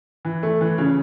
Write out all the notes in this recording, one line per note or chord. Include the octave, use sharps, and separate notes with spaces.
E3
A3
E3
C#3